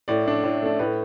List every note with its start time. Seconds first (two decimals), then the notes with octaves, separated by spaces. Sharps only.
0.08 A2 D5
0.26 A3 D4
0.43 A2
0.62 A3 D4
0.79 A2 B4